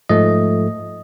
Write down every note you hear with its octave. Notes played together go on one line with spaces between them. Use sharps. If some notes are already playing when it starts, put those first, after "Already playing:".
G#2 F3 A3 D#5